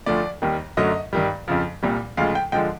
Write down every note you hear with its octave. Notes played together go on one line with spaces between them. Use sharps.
D2 D3 F3 A3 D5
D#2 D#3 G3
F#2 D3 F#3 A3 D#5
G2 D#3 G3
F2 C#3 F3
C2 A#2 G3
D2 C#3 F3 G#3 F5
G5
D3 F3 G#3 G5